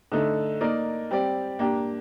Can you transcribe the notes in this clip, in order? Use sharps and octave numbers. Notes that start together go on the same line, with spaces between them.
D3 A3 D#4 A4
A#3 D#4 A#4 D5
G3 C4 G4 D5
A#3 D4 G4